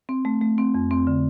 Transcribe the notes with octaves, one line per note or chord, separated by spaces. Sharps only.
C4
A3
A3
C4
F2
C4
D3